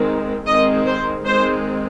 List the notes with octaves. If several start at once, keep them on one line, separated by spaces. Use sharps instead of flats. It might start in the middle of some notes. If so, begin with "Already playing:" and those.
Already playing: D#3 G#3 C4
D#3 G#3 C4 D#5
C5
D#3 G#3 C4 C5